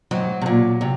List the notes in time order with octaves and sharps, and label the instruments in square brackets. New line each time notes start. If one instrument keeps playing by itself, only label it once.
[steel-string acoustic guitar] G#2 [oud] F#3
[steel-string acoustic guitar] C3
A#2
C3